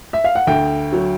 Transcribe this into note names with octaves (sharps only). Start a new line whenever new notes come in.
E5
F5
F#5
D2 G5
F#3